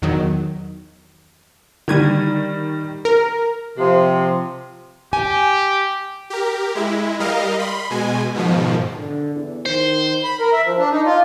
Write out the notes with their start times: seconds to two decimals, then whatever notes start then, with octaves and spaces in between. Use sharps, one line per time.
0.02 E2 D#3 F#3
1.88 D3 D#3 G3 G#6 D#7
3.05 A#4
3.76 C3 F3
5.13 G4 G#5
6.30 G4 A#4
6.75 G#3 E4
7.20 G3 A#4 D#5 F5
7.59 B5 C6
7.90 B2 G#3 G#5
8.34 G#2 B2 D#3 F3
8.98 D3
9.35 E2
9.66 D#3 C5
10.24 B5
10.40 A#4
10.53 E5
10.65 F3
10.78 D4
10.91 D#4
11.06 F4